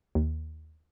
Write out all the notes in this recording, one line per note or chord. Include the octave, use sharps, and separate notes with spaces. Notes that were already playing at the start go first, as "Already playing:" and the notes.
D#2